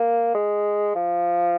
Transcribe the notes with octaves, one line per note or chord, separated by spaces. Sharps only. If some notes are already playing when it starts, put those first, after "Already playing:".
Already playing: A#3
G#3
F3